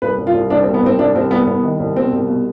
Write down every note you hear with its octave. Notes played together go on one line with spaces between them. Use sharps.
C2 B4
C2
F4
C2
C2 D4
C4
C2
B3
C2 C4
C2 D4
C2 C4
C2 B3
C2 B3
D#3
C2
B2 C4
C2
B2